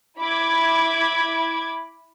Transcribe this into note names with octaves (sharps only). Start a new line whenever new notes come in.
E4 B5 D6 G#6